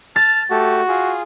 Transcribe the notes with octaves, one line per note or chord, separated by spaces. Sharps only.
A5 F6 A6
A3 F#4 G4 A4
F4 G#4